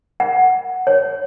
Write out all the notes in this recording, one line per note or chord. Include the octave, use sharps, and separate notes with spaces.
F#5
C#5